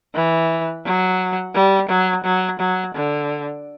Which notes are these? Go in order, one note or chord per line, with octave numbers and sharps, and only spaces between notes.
E3
F#3
G3
F#3
F#3
F#3
D3